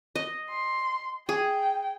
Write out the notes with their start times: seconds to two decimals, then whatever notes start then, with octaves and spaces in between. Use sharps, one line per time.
0.15 D#5
0.50 C6
1.29 G#4 G5